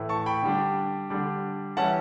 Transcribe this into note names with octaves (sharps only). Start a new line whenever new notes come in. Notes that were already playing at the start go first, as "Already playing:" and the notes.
Already playing: A2 E3 A3 E4
A5 C#6
G5 B5
D3 G3 D4
D3 G3 D4
E3 G3 C#4 E4 F#5 A5